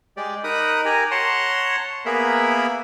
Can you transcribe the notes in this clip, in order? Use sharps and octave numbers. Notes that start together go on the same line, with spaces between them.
G#3 G4 D5
D#4 A#4 B5 D#6 F#6
G4 A#4 G#5 A#5
C#5 F#5 A5 A#5 C6
A#3 B3 G#4 A#4 E5 B5